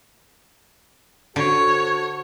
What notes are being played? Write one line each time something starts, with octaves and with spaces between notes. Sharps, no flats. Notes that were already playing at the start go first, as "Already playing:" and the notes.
D3 F#4 A4 C5 C#5